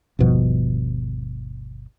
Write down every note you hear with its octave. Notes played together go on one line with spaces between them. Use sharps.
G1 D#2 B2 F3